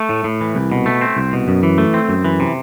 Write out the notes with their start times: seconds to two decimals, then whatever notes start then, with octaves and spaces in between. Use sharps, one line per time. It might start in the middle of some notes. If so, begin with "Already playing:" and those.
Already playing: A3
0.09 A2
0.24 A2
0.41 E3
0.55 C2
0.72 B2
0.86 A3
1.01 C4
1.17 C2
1.33 B2
1.48 F#2
1.63 E3
1.78 A3
1.94 C4
2.09 F#2
2.25 E3
2.40 C3